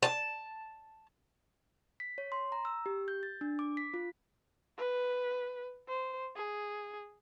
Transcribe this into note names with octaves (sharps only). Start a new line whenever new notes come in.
A5
B6
C#5
C6
A#5
E6
G4
G6
A6
D4
D6
B6
F4
B4
C5
G#4